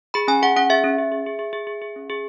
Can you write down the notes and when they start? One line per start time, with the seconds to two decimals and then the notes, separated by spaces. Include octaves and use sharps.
0.14 G#4 B5
0.28 C#4 G#5
0.42 G#4 F#5
0.56 C#4 F#5
0.70 G#4 E5
0.84 C#4
0.98 G#4
1.12 G#4
1.26 G#4
1.39 G#4
1.53 G#4
1.67 G#4
1.82 G#4
1.96 C#4
2.10 G#4